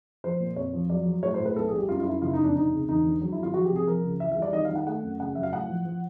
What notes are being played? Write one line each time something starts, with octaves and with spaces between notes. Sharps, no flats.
F3 C5
A#2
F2 C#5
F3
F#3 D5
F#3
A2 C#5
C5
A2
B4
B1 A4
G#4
G3
G4
F#2 F4
F4
F#2 E4
F#1 F4
E4
D#4
F2
D4
C3 D#4
C#2
E1 D#4
D3
F#3
E4
G#1 F4
F3 F#4
G4
C2
G#4
F3 A#4
C#2
E3 E5
E5
G3
D5
D#3 D#5
F5
D#3
F#5
A3 F#5
F#2
C#3 F#5
F#3 E5
F5
A2 F#5
F3
F3